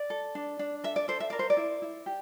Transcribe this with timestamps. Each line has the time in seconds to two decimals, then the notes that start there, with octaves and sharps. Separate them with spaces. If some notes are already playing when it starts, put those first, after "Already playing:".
Already playing: D5
0.10 A4
0.35 D4
0.59 D4
0.84 A4 E5
0.96 D5
1.08 A4 C5
1.20 E5
1.30 A#4 D5
1.39 C5
1.50 D5
1.57 E4
1.82 E4
2.06 G4